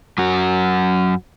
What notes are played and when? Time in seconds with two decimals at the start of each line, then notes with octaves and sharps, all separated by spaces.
0.18 F#2 F#4